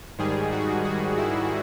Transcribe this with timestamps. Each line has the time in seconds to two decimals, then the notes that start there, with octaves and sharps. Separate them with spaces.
0.18 G#2 D#3 G3 G#4
0.52 F#4
0.84 F#4
1.18 E4